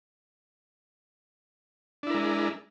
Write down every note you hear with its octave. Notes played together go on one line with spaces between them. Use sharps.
G#3 D4 E4 A#4